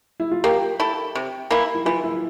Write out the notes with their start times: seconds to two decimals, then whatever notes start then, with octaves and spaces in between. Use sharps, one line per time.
0.20 E4
0.31 F4
0.44 A#3 G4
0.80 E4 A4
1.15 C3
1.51 E3 A#3 E4
1.75 E4
1.85 E3 F4
2.04 E4